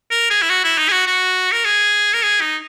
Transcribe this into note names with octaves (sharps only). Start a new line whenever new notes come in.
A#4
G#4
E4
F#4
E4
D#4
G#4
F#4
F#4
A#4
G#4
A#4
G#4
D#4